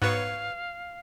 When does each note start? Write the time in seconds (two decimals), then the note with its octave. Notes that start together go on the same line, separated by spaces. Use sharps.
0.02 G#2 B3 F#4 B4 C#5 F5